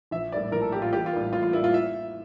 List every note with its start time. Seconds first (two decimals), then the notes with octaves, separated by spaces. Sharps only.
0.11 A#1 E5
0.32 A2 G3 A#3 D5
0.52 A#1 A#4
0.62 A4
0.72 A2 G3 A#3 G4
0.82 F4
0.93 A1 G4
1.06 F4
1.13 A2 G3 A#3
1.32 A1 F4
1.43 F4
1.53 A2 G3 A#3 E4
1.64 F4
1.74 E5